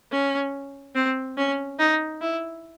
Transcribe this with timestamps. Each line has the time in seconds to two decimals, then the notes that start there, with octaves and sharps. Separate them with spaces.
0.12 C#4
0.95 C4
1.38 C#4
1.79 D#4
2.22 E4